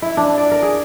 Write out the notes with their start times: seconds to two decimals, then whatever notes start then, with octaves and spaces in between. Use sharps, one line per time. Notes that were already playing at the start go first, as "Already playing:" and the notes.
0.02 E4
0.17 D4
0.38 D5
0.51 A#4
0.62 G#4